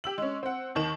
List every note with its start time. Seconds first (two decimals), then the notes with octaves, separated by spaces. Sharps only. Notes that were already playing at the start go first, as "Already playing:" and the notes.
0.04 G4 E6 F#7
0.18 G#3 C#4
0.43 C4 F#5
0.75 D#2 D#3 E7